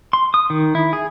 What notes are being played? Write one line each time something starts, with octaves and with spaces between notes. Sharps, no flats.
C6
D#6
D#3
E4
G#4